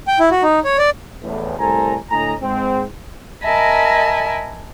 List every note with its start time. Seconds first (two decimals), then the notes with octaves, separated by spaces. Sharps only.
0.08 G5
0.20 E4
0.31 F#4
0.43 D#4
0.65 C#5
0.78 D5
1.23 A1 E2 A2
1.59 C2 A2 A4 C5 G#5 A#5
2.10 A2 D3 D#5 G#5 A#5
2.42 G#2 C4
3.43 A#4 D#5 E5 G#5 A5 B5